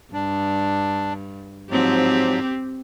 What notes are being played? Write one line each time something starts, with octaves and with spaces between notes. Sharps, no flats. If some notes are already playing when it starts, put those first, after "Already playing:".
G2 D4
G#2 F3 F#3 C4 G4